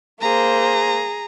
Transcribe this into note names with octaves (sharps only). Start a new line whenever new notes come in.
A#3 G#4 C5 A#5